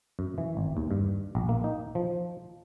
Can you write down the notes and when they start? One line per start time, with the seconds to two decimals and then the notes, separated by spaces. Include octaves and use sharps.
0.19 F#2
0.38 E3
0.57 G#1
0.77 D#2
0.91 G2
1.35 A#1
1.49 A#3
1.64 D#4
1.95 F3